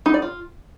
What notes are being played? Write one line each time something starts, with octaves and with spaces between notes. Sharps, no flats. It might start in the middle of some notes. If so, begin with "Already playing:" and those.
D#4
D5
F4